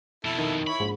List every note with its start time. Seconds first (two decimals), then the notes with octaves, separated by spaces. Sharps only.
0.25 F2 B2 E4 A4
0.38 D#3
0.67 E4 C#5 B5
0.80 A#1 G#2